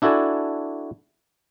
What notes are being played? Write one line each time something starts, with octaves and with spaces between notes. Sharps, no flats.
D4 E4 F#4 A4 D5 G#5